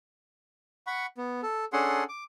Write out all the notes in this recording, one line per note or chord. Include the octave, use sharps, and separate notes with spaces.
F#5 B5 C#6
B3
A4
C#4 D4 G#4 A4 F#5 C6
D6